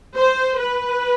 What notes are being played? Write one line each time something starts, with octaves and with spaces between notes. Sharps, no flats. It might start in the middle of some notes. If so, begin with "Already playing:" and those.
C5
B4